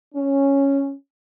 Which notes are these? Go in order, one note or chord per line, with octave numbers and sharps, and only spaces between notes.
C#4